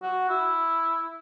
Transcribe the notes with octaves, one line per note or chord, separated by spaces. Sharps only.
F#4
E4